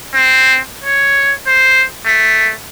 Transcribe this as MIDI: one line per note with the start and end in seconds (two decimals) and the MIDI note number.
0.15 0.59 60
0.84 1.33 73
1.47 1.84 72
2.06 2.53 57